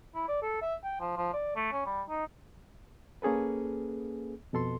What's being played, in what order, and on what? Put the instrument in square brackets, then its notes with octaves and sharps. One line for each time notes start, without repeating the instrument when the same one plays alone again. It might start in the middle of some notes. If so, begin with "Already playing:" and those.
[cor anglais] E4
D5
A4
E5
G5
F3
F3
D5
A3
C#4
G3
D#4
[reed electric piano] A#3 C#4 G#4 A4 B4
F2 B2 A4 C6